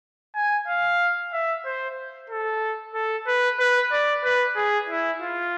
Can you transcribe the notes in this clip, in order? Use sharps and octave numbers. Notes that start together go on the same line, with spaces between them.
G#5
F5
E5
C5
A4
A4
B4
B4
D5
B4
G#4
E4
F4